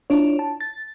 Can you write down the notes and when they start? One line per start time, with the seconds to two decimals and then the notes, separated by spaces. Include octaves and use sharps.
0.10 D4 E4 F4 C#5
0.39 A5
0.60 A6